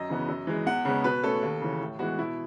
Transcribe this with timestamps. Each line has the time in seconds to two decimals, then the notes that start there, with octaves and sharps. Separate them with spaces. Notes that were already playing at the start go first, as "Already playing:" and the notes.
Already playing: F#2 D#5
0.09 C#3 E3 B3
0.28 F#2
0.47 E3 G#3
0.66 E2 F#5
0.85 C#3 G#3 B3
1.04 B2 B4
1.24 A3 C#4 A4
1.43 D#2
1.61 C#3 E3
1.81 A2
1.99 E3 G#3 B3 F#4
2.19 B2 E4